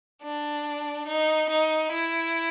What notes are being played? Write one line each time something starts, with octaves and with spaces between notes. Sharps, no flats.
D4
D#4
D#4
E4